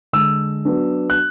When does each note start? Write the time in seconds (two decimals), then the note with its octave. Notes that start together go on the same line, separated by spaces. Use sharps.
0.13 D3 G#3 D4 E6
0.65 F#3 B3 D4
1.10 F#6